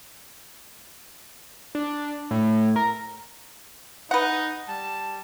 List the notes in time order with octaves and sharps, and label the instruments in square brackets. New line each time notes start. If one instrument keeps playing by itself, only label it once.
[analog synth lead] D4
A2
A#4
[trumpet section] D#4 [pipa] B4 F#5
[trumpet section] G3 A5